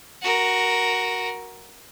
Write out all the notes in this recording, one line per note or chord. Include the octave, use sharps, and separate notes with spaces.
F#4 A#4